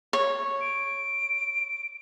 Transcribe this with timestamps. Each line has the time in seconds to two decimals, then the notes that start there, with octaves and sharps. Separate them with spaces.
0.13 C#5
0.61 D7